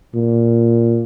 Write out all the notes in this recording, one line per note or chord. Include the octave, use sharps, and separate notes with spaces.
A#2